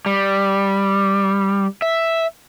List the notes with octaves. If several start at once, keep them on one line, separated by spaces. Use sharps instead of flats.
G3
E5